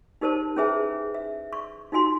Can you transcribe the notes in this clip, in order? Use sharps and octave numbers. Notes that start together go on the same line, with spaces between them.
D#4 G4 A#4 C5 A5
C#4 E4 G#4 B4 E5 G#5
E5
C#6
D#4 F4 F#4 G#5 C6